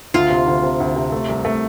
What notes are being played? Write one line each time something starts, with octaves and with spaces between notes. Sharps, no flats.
D2 F4
C3
D2
C3
D2
C3
A3
C2
A3